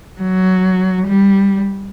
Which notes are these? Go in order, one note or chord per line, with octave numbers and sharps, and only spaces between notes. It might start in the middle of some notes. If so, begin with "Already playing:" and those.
F#3
G3